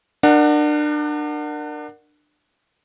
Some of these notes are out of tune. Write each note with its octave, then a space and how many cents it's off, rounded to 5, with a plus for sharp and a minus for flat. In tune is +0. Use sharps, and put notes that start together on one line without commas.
D4 +30 A#4 +0 F#5 +0